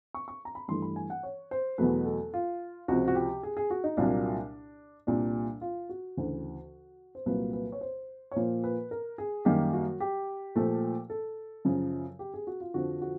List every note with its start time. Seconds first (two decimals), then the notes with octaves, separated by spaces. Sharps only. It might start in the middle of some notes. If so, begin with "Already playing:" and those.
0.14 C#6
0.28 C#6
0.45 A#5
0.55 B5
0.68 G2 E3 A3 C6
0.82 B5
0.96 G#5
1.10 F#5
1.23 C#5
1.51 C5
1.78 E2 B2 F#3 A3 B4
2.06 A4
2.34 F4
2.88 C#2 C3 F3 F#4
3.08 F#4
3.15 G4
3.43 G#4
3.57 G#4
3.70 F#4
3.84 D#4
3.97 C2 A#2 F#3 A#3 D4
5.07 C2 A#2 G3 D4
5.61 F4
5.89 F#4
6.17 D2 C#3 E3
7.15 C5
7.26 C2 A#2 F#3 A#3 B4
7.53 B4
7.72 C#5
7.81 C5
8.31 C#5
8.36 A#2 F3 A#3 C5
8.64 B4
8.91 A#4
9.18 G#4
9.45 F#2 D#3 G3 A#3 G4
9.73 F#4
10.00 G4
10.56 A#2 F3 A3
11.10 A4
11.65 F#2 C#3 F3
12.19 G4
12.34 G#4
12.47 F#4
12.60 F4
12.74 F2 D3 F3 F#4
13.02 F#4